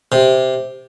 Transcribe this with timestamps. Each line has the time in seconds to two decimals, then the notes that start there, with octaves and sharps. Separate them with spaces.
0.12 C3